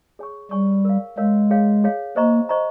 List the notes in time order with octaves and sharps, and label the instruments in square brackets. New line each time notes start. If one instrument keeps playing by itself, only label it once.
[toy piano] G#4 C#5 G#5 C#6
[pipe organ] G3 [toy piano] G#4 C#5 G#5 C#6
[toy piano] A#4 C#5 F5
[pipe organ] G#3 [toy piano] A#4 C#5 F5
[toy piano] G#4 C#5 F5
G#4 C#5 F5
[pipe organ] A#3 [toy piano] C5 D#5 A#5 C#6
[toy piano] C5 D#5 A#5 C#6